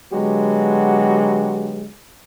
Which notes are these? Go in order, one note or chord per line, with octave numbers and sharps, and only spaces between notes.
D3 F#3 G#3 B3 F#4 G4